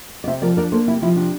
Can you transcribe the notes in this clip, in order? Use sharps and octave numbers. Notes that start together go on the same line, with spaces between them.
D5
C3 C5 E5
F3 A#4 D5
D4 A#4 D5
A#3 A4 C5
C3 E4
F3 E4
C3 D4